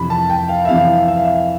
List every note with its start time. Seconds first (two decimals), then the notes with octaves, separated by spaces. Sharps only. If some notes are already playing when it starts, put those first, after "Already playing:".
Already playing: F2 C3 E3 B5
0.10 A5
0.29 G5
0.49 F5
0.65 E5
0.69 F2 C3 E3 F5
1.08 E5
1.16 F5
1.25 E5